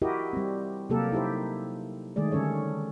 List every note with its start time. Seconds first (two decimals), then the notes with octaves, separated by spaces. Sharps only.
0.02 E4 F#4 G4 A#4 D#5
0.33 G3 C4
0.90 C3 F#3 A#3 G4 A4 A#4
1.12 D#4 E4 G4 C5
2.16 D#3 G#3 A3 G#4 D5
2.32 D3 G3 C#4 A4 C#5